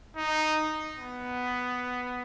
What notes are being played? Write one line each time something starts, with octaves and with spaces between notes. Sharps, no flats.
D#4
B3